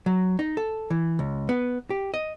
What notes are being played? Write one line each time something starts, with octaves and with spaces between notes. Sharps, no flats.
F#3
D#4
A4
E3
C#2
B3
G4
D#5